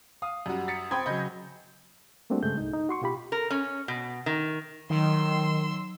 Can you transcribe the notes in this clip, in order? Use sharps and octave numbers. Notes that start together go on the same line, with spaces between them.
F5 D#6
F#2 G3 F#4
A6 B6 C#7
C4 G5 B5 C6 D#6 G#6
C#3 F#3 D#5 B5 G6
G3 A3 A#3 C4 D4 F#4
G2 C#3 G#3 A3 G#4 G6
C2 D#4
D#4
F#4 C6 C#6
B2 F4 G4 B5
A#4
C#4
B2
D#3
D#3 F#3 C6 E6